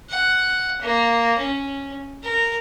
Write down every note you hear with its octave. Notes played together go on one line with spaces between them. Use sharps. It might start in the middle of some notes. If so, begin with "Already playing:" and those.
F#5
A#3
C#4
A#4